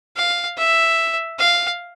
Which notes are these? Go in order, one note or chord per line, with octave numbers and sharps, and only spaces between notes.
F5
E5
F5